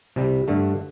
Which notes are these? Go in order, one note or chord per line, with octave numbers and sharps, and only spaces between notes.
C2 C3 G3
G2 D3 A3